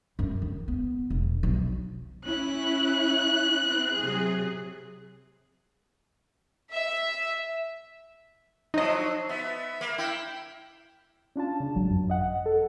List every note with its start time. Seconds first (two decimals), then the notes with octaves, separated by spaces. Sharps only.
0.19 F#2
0.42 D#3
0.68 B3
1.10 E1
1.43 B1
2.24 C#4 E4 F#6
3.65 C4 E4
3.96 C3 F#3 G#4
6.71 E5
8.74 F3 F#3 D#4 D#5
9.29 B3 E5
9.81 A#3
9.98 E4 G5
11.36 C#4 D4 F4 A5
11.60 C#3
11.75 G#1 F#3
11.91 F#2
12.10 D#5 F#5
12.46 A4